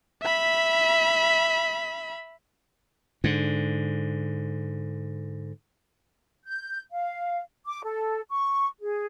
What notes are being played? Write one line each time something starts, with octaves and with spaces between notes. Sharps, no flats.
E5 B5
G#2 D3
G6
F5
D6
A4
C#6
G#4